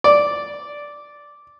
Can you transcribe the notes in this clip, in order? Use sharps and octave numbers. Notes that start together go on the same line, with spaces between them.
D5